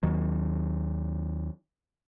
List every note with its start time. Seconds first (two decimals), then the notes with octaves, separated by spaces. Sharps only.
0.03 D#2 D#3 F#3